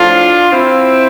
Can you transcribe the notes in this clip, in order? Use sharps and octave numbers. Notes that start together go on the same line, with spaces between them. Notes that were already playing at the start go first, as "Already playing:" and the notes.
Already playing: A2 F3 D4 F4
C4 E4